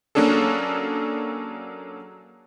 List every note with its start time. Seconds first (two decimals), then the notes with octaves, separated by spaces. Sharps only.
0.15 F#3 A#3 C#4 D4 G#4 A4